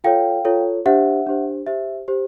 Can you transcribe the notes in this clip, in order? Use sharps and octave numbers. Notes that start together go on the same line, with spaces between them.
F4 A4 C#5 F5 G5
F4 A4 C#5
D4 G4 C5 E5 F#5
D4 G4 C5
G4 C5 E5
G4 C5